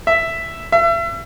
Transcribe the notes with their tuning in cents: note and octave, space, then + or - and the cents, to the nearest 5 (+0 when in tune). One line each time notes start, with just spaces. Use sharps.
E5 +5
E5 +35